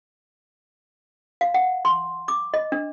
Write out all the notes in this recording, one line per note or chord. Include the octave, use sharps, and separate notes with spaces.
F5
F#5
C6
D6
D#5
D4